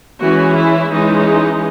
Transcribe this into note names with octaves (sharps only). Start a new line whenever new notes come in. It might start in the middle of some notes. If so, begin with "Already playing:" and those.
E3 G#3 C#4 F#4
E4
E3 G#3 C#4 D#4